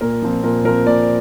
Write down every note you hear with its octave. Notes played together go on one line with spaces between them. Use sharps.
A#2 A#4
F3 C4
A#2 A#4
F3 C4 A#4
A#2 D5